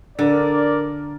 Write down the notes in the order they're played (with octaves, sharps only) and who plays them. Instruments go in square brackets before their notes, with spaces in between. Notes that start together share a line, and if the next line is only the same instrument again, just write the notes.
[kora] D3 [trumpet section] A#4 D5